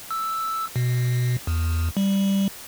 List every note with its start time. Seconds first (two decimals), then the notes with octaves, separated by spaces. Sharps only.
0.11 E6
0.76 B2
1.47 E2
1.97 G3